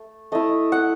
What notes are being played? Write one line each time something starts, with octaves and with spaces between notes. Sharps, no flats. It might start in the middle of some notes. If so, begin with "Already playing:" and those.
Already playing: A3
A3 E4 D#5
F#5